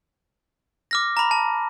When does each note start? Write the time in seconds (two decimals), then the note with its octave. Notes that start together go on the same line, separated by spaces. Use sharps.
0.91 D6 F6 A#6
1.17 A#5 B5
1.31 A5